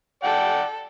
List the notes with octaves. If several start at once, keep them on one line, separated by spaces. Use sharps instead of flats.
A4 D5 F#5 G5